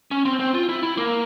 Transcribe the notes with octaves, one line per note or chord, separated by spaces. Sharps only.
C#4
C4
C4
F4
E4
E4
A#3